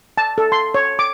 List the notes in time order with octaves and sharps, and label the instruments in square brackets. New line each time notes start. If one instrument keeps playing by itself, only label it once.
[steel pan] A5
A4
C6
C#5
D6